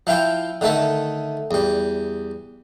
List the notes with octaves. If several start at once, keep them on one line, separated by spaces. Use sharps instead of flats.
F3 E4 F4 G5
D3 D#3 A3 A4
E2 G3